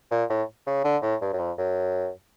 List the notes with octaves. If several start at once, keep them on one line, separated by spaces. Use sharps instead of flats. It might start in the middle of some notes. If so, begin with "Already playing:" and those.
A#2
A2
C#3
D3
A2
G2
F#2
F2
F#2